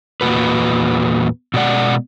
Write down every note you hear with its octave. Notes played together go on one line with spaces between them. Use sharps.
E2 A#2 F3 F#4 B4
B2 G#3 D5 F#5